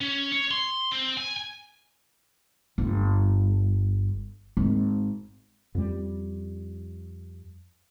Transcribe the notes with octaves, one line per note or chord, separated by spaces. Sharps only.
C#4
C#5
C6
C4
G#5
G1
G#1
F2 G3